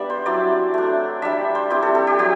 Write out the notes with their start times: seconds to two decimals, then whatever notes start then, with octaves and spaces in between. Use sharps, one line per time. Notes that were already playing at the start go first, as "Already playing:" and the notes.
Already playing: G3 B3 D4 D5 E5
0.10 C5
0.26 F#3 C4 E4 D5
0.74 A3 D4
1.22 G3 D4 E5
1.55 C5
1.70 G3 C4 E4 G4
1.82 A4
1.95 A4
2.07 G4
2.19 F#3 G4